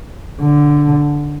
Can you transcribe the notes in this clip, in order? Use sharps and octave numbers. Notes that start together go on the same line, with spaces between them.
D3